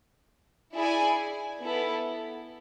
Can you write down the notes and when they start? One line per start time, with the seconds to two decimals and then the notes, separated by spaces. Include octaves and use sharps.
0.74 E4 G#4 D5 G#5
1.61 B3 E4 A4